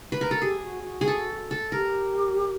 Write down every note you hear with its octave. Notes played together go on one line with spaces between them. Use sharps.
B4
A#4
F#4 A4
G4 G#4
F#4
F#4
G#4
A4
A4
G4 A#4